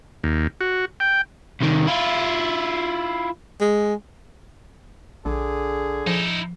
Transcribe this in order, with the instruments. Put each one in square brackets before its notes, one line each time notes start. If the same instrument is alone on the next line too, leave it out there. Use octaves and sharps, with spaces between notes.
[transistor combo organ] D#2
F#4
G5
[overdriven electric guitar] C2 D#3
E4 F4
[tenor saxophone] G#3
[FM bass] A#1 [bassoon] D3 [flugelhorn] G#4
[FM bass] F3 [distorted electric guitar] D#4 E4